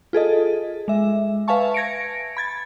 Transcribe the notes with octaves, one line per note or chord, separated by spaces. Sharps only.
F4 G#4 A4 D#5
G#3 E5
B4 E5 F5 G#5 A5 C#6
G#6 A#6 C#7 D7
B5 G#6 A6